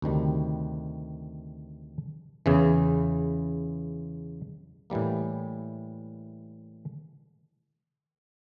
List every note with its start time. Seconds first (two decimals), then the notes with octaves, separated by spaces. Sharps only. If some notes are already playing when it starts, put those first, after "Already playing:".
0.02 D2 C3 D#3 G3
2.46 E2 C#3 E3
4.90 A2 E3 G3 A#3